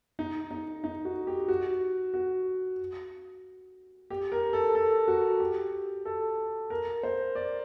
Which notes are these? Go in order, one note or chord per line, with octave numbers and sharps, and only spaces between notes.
D#4
D#4
D#4
F#4
G4
F#4
F#4
G4
A#4
A4
A4
F#4
G4
A4
A#4
C5
D5